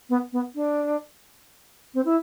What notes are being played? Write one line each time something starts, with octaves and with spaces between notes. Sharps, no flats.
B3
B3
D4
C4
E4